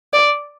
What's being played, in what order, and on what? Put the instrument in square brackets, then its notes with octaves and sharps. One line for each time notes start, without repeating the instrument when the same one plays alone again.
[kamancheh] D5